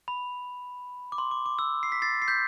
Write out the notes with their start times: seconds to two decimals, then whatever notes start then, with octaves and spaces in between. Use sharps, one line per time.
0.08 B5
1.12 D6
1.18 C6
1.31 D6
1.46 D6
1.59 E6
1.83 C7
1.92 B6
2.02 A6 C7
2.22 C7
2.28 G6 B6